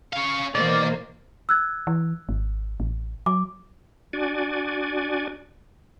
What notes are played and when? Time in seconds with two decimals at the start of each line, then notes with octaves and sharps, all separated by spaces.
0.13 C#4 F5 C#6
0.55 B2 D#3 E3 A#3 C5 D5
1.49 E6 F#6 G#6
1.87 E3
2.29 G#1
2.80 A1
3.26 F#3 D6
4.13 D4 F#4 D5 G#5